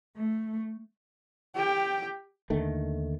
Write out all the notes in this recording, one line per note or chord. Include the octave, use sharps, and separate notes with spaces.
A3
G4 G5
D#2 D3 D#3 A3